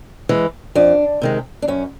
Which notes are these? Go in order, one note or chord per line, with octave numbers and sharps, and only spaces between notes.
E3 G#3
F2 D4
C3 D#3 G#3
D4
F#2 C#4